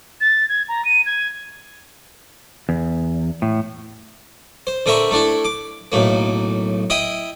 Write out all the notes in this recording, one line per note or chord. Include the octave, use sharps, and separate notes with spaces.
A6
G#6
A#5
D#7
G#6
E2
A2
C5
D3 C4 A#4 E5 C#6
A3 D4 E4
D6
B1 A2 A#3
E4 D#5 G5